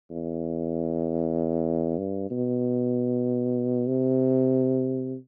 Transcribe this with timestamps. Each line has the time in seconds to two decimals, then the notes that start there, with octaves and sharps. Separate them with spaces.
0.11 E2
1.98 G2
2.31 B2
3.87 C3